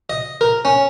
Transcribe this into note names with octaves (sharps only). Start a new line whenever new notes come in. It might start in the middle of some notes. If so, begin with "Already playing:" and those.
D#5
A#4
C#4